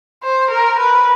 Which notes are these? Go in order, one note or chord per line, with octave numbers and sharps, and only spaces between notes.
C5
A#4
B4